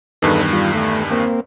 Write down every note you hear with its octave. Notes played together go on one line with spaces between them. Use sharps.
E2 G2 D#3 D#4 A4 B4
G3 F4
A3
A#3 C4